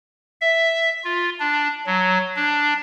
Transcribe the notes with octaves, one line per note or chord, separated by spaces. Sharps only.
E5
F4
D4
F#3
D4